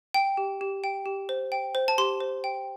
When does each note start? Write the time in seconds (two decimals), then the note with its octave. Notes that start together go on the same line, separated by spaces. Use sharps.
0.14 G5
0.37 G4
0.61 G4
0.84 G5
1.06 G4
1.29 C5
1.52 G5
1.75 C5
1.88 A5
1.98 G4 C6
2.20 C5
2.44 G5